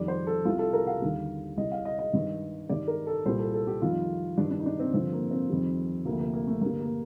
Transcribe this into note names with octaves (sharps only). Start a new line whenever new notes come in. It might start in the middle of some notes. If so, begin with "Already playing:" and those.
Already playing: F2 D#3 G3 D5
C5
A4
C2 C3 G3 F4
A4
A#4
F5
D#2 D3 G3
C2 C3 G3 D#5
F5
D#5
D#5
G2 D#3 G3
G2 D#3 G3 D5
A#4
A4
C2 A#2 G3 C5
A4
A4
G4
F2 D#3 G3 F4
G2 D#3 G3 D4
D4
D#4
D4
C4
G2 D3 F3 C4
A#3
C4
F2 D#3 G3
D2 C3 F3 A#3
A#3
A#3
A3
G2 D3 G3 A#3
A#3